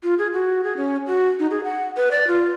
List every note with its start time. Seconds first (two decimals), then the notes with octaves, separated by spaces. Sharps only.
0.03 F4
0.18 G#4
0.33 F#4
0.64 G#4
0.77 C#4
1.07 F#4
1.39 D#4
1.51 G#4
1.64 F#5
1.97 B4
2.11 D5
2.28 F4